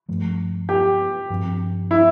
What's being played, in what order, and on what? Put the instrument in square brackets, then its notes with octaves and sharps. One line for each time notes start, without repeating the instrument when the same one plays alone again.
[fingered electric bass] G2 F3 A3
[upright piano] G4
[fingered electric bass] G2 F3 C4
[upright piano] E4